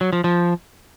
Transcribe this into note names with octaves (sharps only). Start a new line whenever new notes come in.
F#3
F3
F3